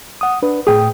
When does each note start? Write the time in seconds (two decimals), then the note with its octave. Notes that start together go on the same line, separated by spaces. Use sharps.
0.21 F#5 D#6
0.42 D4 B4
0.67 A2 G#4 G5 D#6